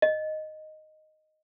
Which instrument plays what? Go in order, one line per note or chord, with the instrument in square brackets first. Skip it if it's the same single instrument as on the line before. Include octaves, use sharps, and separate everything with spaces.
[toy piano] D#5